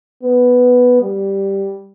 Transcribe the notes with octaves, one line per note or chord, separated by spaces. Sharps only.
B3
G3